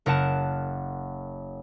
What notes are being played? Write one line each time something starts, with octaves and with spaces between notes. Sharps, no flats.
F#1 A#4 F#5 A5 E7